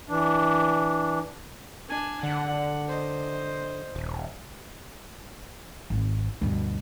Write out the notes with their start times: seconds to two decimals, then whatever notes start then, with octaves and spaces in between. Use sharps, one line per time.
0.09 E3 D4
1.89 D4 G#5
2.23 D3 F#5
2.88 C5 D#5
3.95 D#1
5.90 G#1
6.42 D2 G2 B2